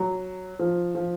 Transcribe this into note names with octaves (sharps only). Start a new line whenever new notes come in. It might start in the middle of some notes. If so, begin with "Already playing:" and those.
Already playing: F#3
F3
F3